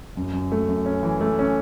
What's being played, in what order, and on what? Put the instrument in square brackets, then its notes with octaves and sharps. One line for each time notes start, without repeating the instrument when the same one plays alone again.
[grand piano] F#2
F#2
A3
F#2
C#4
E3
A3
C#4